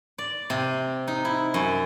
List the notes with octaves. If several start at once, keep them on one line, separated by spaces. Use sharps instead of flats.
D5
C3
D#4
E4
F#2